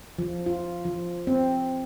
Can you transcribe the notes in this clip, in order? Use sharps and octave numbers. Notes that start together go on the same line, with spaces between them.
F3
F4
F3
C4